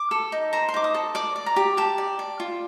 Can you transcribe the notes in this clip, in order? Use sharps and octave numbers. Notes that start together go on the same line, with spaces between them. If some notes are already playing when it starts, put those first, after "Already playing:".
Already playing: D6
A4
D#4
C5 A#5
C6
D#4 D6
D#6
A4
D5 D6
D5
A#5
G4
G4 A5
D5
D5
F4